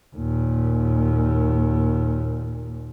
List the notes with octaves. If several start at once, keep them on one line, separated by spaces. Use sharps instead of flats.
D#2 A#2